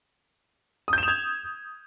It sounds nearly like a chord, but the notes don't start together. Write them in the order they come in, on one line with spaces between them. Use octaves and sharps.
D#6 G6 E7 F7 G#6